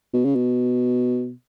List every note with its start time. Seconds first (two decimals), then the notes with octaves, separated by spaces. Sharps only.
0.14 B2
0.25 C#3
0.35 B2